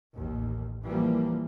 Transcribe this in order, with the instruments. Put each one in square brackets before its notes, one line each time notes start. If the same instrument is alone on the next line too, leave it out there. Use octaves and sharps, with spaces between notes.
[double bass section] A1 D#2
E3 F3 G3 A#3